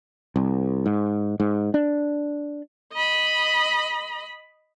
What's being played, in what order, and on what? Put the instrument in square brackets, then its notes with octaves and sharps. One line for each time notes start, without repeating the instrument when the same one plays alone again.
[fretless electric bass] C2
G#2
G#2
D4
[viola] D#5 B5